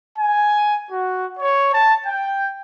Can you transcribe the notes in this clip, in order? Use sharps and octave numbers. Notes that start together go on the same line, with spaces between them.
G#5
F#4
C#5
A5
G5